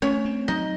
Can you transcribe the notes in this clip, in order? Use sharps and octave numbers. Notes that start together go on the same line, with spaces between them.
A3 C#4 C#5
C4
F#3 D#4 D#5